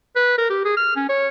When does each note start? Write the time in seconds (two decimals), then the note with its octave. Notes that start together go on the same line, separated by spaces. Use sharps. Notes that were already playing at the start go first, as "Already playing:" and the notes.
0.16 B4
0.38 A#4
0.50 G4
0.65 G#4
0.77 F6
0.96 C#4
1.09 C#5